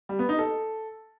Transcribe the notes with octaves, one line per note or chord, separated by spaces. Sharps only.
G3
B3
D#4
A4